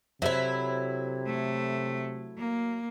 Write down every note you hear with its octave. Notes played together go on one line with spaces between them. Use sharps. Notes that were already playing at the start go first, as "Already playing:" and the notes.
C3 F#3 E4 A4 C5 E5
A3
A#3